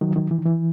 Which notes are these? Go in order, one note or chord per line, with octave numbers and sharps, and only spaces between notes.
D#3 F#3
D#3 F#3
E3
D#3
E3